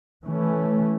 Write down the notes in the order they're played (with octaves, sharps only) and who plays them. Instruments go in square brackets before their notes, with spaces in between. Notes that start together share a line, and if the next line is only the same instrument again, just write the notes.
[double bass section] E3 A3 C#4